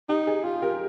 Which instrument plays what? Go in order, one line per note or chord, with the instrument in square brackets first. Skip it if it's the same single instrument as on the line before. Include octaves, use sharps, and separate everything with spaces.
[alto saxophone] D#4 [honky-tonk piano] G4
[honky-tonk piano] G#4
[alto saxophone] F4 [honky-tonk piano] G4
[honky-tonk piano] G4 A#4